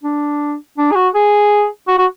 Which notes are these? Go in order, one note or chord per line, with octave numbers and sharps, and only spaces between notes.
D4
D4
G#4
F#4
G#4
F#4
F#4